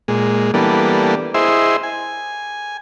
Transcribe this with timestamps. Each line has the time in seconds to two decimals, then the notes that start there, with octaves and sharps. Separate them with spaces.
0.08 A#2 G#3
0.54 E3 G3 A#3 B3 D4 A4
1.34 E4 G#4 C5 D#5 E5 C6
1.83 G#5